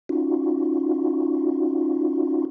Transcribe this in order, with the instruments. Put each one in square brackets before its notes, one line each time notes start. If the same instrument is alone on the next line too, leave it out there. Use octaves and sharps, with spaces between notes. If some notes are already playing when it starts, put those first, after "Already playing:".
[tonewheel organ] C#4 D#4 F4 F#4